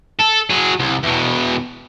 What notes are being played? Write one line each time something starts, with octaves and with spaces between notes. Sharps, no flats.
A4
F#3 G#4
C2
E2 B2